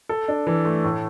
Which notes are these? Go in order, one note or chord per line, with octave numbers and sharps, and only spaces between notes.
A4
D4
E3
A3
A2